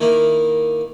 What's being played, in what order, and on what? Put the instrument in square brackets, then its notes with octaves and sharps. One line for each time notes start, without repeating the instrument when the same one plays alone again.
[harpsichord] D#3 A#3 E4